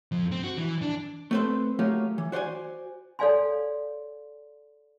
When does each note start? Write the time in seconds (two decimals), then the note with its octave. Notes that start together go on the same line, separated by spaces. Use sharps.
0.12 F2
0.32 C4
0.44 F#4
0.58 E3
0.82 D4
1.31 A3 B3 C4 A4 B4 C5
1.79 F#3 A3 A#3 C#4 F4 G4
2.18 E3
2.32 F#4 C5 D5 F5 G#5
3.19 A4 C#5 D5 F5 G#5 C6